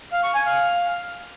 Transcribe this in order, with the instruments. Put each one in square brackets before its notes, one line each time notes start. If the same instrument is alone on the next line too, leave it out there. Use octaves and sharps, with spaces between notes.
[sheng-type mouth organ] F5
C#6
G#5
F5